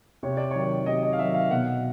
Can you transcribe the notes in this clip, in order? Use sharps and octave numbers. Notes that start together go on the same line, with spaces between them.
C3 C#5
D5
D#3 F#3 C#5
C3 D#5
D#5
F5
D#3 F#3 E5
F5
B2 F#5